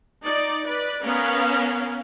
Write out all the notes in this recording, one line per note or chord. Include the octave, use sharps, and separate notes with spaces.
D#4 D5
B4 D5
B3 C#4 A#4 F5